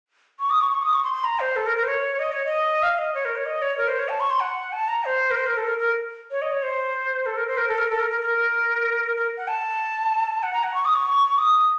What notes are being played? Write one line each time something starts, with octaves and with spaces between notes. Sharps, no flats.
C#6
D#6
C#6
C#6
D#6
C#6
C6
C6
A#5
C5
A4
A#4
A#4
C5
C#5
D#5
C#5
D#5
F5
D#5
C#5
A#4
C#5
D#5
C#5
A#4
C5
C#5
A5
C#6
C6
F#5
A5
A#5
C5
A#4
C5
A#4
A4
A#4
A#4
C#5
D#5
C#5
C5
A4
A#4
C5
A#4
A4
A#4
A4
A#4
A#4
A#4
A#4
F#5
A5
F#5
A#5
F#5
C#6
D#6
C#6
D#6